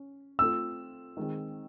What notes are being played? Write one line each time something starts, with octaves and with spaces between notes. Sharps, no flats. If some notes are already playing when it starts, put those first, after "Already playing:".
Already playing: C#4
A3 C4 F4 A4 E6
D#3 G#3 C4